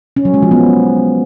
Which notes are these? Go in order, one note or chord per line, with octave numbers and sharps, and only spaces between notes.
C#4
F#3
G#3
F3
B3